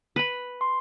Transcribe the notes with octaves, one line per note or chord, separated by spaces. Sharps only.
B4 B5
C6